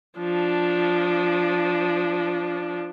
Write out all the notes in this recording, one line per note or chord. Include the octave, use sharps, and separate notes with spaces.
F3 D4